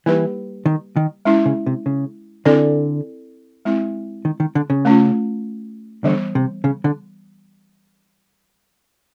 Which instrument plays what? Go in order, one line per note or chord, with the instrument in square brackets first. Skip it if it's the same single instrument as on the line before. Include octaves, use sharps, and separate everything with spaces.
[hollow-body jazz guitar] E3 [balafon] G3 A#3 D#4 G4 B4
[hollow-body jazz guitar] D#3
D#3
[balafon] G#3 C#4 E4
[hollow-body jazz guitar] C#3
C3
C#3
[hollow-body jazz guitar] D3 [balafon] C4 E4 A4 D5
[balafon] G#3 C4 E4
[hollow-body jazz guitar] D#3
D#3
D3
C#3
[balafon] A3 C#4 F4
[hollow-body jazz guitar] D3 [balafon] E3 G3 B3
[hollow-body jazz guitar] C3
C#3
D3